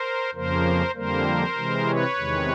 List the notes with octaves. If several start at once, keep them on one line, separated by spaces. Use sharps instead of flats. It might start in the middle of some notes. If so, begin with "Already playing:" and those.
Already playing: A#4 C5
F2 C#3 F3 A#3 A#4 C5
F2 D3 G3 A#3 A#4 C5
C3 E3 G#3
B4 C#5
E2 C3 D#3 G#3